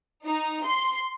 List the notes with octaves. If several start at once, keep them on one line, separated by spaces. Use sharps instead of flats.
D#4
C6